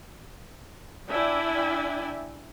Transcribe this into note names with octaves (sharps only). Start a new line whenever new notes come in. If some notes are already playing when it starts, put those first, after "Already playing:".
D4 E4 D5 E5 G5 G#5